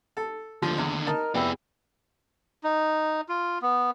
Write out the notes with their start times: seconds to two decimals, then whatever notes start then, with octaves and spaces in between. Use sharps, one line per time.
0.17 A4
0.62 D#2 D3 F3
0.78 E2
1.07 D#4 A#4 D#5 A5
1.35 F1 B3 E4 G#4 D5 G5
2.64 D#4
3.29 F4
3.62 B3